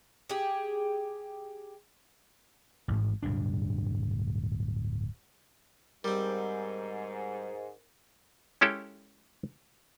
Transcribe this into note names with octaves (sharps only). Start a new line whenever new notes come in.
G4 G#4
A1 G#2
D1 G2 B2 D4
G#2 G3 C4 A#4
G#3 C#4 E4 G4 A4